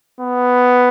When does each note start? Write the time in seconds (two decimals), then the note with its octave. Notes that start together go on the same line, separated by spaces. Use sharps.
0.21 B3